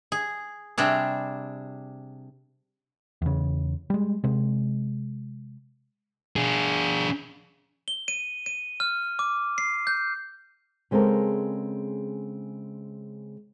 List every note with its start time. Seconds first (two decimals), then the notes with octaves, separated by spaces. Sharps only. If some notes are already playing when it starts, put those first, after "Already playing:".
0.12 G#4
0.78 C3 G3 D4 G#4
3.22 E2 C#3
3.90 G3 G#3
4.24 C3 G#3
6.36 D4 G#4
7.88 G7
8.08 D#7
8.46 D#7
8.80 F6
9.19 D6
9.58 C7
9.87 G6
10.91 C#3 G#3 C4 A4 A#4